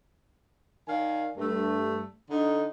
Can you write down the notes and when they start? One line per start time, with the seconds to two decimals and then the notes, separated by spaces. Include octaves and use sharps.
0.88 D#3 D5 F5 G#5
1.37 G2 A3
2.30 D3 D#4